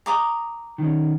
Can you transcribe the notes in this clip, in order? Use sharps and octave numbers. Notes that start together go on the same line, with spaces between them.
A#5 D6 D#6
D#3 C#4